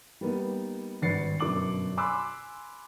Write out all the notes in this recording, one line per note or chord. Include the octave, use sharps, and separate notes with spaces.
G3 A#3 B3 D#4
G#1 G2 B4 A6 C7 C#7
G1 F#2 B2 D4 D6 F#7
G#5 B5 C6 D6 E6 F#6